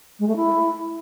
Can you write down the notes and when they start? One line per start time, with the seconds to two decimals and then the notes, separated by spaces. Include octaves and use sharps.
0.19 G#3
0.28 A3
0.36 E4